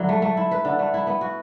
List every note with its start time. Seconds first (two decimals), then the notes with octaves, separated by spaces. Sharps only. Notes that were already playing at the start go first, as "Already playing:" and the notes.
Already playing: D3 F#3 E4
0.09 A3
0.22 A3
0.37 E4
0.51 B4
0.65 D3
0.79 A3
0.94 E4
1.07 B3
1.21 F#4